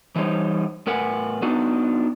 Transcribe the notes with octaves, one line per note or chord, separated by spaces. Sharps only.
E3 G3 D#4 C5 C#5
A2 A#4 B4 F#5 G#5
B3 D4 D#4 F#4 B4